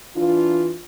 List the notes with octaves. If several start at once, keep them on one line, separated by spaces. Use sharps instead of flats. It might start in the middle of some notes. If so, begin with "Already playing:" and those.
E3 D4 F4